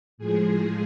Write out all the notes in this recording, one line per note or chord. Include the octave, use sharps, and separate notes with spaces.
A2 F3 G#3 G#4